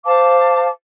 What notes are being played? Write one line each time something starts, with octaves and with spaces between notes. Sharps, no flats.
C5 F5 A5 D6